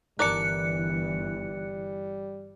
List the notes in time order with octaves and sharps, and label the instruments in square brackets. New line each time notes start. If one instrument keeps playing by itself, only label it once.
[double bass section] G1 E3 [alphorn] G3 [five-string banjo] A#4 D5 A5 [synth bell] F#6 C#7